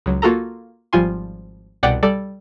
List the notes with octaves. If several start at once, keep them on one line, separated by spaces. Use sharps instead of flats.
C#2 F#3
A#3 F4 F#4 A4 A#5
G#1 F3 G3 F4 G#5 C6
C2 B2 D5 F#5 G5 D6
G3 A4 D5